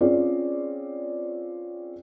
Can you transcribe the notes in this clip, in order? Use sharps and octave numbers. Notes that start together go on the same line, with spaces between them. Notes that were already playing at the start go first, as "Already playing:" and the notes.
C4 C#4 F4 G#4 C#5 D5